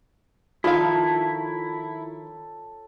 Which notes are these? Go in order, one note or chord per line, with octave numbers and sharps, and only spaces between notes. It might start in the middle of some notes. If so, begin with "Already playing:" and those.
D#3 F3 E4 F4 A4 C#5 F5 A5